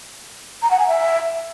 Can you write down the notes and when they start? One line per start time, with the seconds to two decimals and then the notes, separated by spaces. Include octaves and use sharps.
0.62 A#5
0.71 F#5
0.79 G#5
0.88 E5